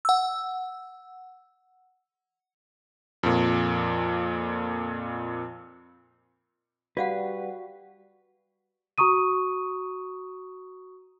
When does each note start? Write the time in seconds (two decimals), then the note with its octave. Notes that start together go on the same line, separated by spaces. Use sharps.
0.05 F#5 E6
3.23 F2 A#2
6.97 G3 F#4 B4 D5 F5 F#5
8.98 F#4 A#5 C#6 D#6 D#7